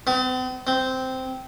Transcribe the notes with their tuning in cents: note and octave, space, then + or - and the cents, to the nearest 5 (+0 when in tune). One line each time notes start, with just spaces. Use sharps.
C4 -45
C4 -10